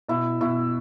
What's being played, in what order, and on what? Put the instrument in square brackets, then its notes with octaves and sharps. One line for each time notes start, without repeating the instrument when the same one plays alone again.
[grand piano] B2 [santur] E4
[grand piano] B2 [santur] E4